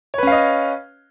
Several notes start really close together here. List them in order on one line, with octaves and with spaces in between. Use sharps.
C#5 B4 C#4 F5 D#5